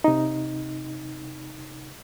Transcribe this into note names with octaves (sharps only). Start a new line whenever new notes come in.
C3 D#4